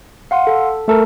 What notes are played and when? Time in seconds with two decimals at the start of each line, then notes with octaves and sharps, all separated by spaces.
0.31 F5 F#5 C6
0.47 A4
0.88 A3 A4 A#4